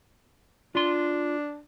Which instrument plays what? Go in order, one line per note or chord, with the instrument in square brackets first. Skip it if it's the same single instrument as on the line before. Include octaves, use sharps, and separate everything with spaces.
[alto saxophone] D4 [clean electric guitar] F4 C6